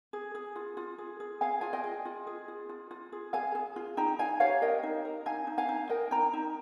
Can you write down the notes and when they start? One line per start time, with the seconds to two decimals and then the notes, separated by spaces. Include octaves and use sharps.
0.13 G#4
0.35 G#4
0.56 F4
0.77 F4
0.98 G#4
1.20 G#4
1.41 G#4 F5 G#5
1.61 F4 G#5
1.73 D#5 G5
1.84 G#4
2.05 F4
2.27 G#4
2.48 F4
2.69 F4
2.91 F4
3.12 G#4
3.33 G#4 F5 G#5
3.55 G#4
3.76 F4
3.97 D#4 G5 A#5
4.19 D#4 F5 G#5
4.40 G4 C#5 F5
4.62 A#4 D#5 G5
4.83 D#4
5.05 A#4
5.26 D#4 F5 G#5
5.47 D#4
5.58 F5 G#5
5.69 D#4
5.89 A#4 D#5 G5
6.11 D#4 G5 A#5
6.33 D#4